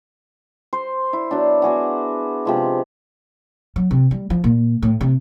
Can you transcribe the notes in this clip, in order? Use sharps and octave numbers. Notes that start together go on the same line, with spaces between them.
C5
E4
F#3 B3 D4
B3 F#4 G#4 F#5
C3 F3 G#3
F#3
C3
G3
F3
A#2
A2
C3